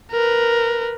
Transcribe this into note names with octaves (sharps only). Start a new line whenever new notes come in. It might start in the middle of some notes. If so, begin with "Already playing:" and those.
A#4 B4